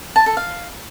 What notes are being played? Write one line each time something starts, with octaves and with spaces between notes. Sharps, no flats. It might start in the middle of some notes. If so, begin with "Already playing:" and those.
A5
A4
F5